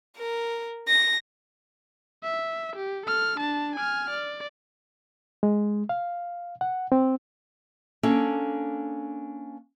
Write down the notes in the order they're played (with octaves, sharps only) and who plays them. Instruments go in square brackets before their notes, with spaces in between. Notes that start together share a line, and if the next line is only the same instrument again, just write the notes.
[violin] A#4
A#6
[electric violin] E5
G4
A4 F6
D4 A5
G#5 F6
D5
[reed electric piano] G#3
F5
F#5
C4
[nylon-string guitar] A#3 C#4 D4 A4